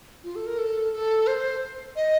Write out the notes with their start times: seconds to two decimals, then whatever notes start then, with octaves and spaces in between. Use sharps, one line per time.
0.24 F4
0.36 A4
0.47 A#4
0.58 A4
0.93 A4
1.27 C5
1.96 D#5